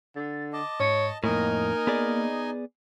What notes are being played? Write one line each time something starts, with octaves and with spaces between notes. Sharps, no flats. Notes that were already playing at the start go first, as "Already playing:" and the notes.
D3 A6
D#5 A5 D6
G#2 C#5
F2 A2 A#3 D#4 A#4 D#5 G#5
B3 G#4 D5